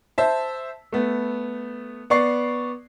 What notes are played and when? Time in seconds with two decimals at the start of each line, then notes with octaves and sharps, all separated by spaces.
0.18 C5 E5 A5
0.93 A3 B3
2.10 B3 D5 C#6 C7